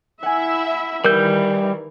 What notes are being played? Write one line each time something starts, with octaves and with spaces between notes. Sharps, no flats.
E4 E5 F#5 G#5
D#3 E3 G3 A#4 G6